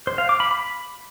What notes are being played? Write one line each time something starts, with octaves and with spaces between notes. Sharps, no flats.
C5
F5
D6
B5
B5